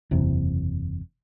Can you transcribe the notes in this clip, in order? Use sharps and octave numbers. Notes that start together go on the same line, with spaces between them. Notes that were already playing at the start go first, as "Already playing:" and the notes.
F#1 E2 C3